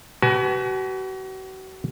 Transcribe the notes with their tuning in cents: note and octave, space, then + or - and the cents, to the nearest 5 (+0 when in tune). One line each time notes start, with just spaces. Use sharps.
F#4 +40 B4 +0 G#5 +40